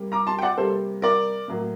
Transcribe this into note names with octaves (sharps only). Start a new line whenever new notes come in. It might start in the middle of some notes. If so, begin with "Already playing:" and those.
Already playing: C3 G3 A#3
A#5 D6
A5 C6
G5
D5 F#5
C3 G3 A#3 A4 C5
A#4 D5
A2 F#3 A#3